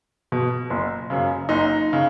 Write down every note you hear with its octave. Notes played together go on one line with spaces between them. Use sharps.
B2
F#1
F#2 C#3
F#1 D#4
C#3